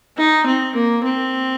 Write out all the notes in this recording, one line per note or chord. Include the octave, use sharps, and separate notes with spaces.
D#4
C4
A#3
C4